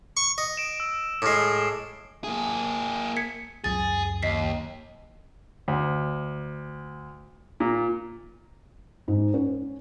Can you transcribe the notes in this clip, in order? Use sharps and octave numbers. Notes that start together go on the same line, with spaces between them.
C#6
D#5
D7 E7
E6
A2 G#3 D6 F6 C7
A#3 G#4
G#6 B6 C#7
C#2 F#2 G#4 A6
D#2 D#5 B6 C7
D2
A#2
G#2
C#4